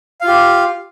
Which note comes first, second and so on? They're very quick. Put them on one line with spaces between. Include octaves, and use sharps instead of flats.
F5 F4 G4